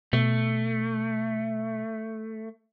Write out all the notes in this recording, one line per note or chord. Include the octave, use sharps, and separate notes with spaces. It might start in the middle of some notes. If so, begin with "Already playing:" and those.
B2 A3